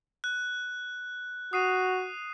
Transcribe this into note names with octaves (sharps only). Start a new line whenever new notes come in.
F#6
F#4 D#6 C7 D#7